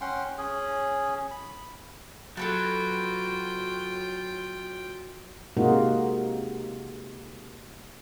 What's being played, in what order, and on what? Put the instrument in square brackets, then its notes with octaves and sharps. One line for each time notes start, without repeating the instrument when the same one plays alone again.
[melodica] C#4 F#5 G5 C6
C#4 G#4
B5
[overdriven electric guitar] F#3 [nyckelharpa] F4 G5 [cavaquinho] A4 B4 A5
[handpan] C3 G#3 A#3 D#4 F4 F#4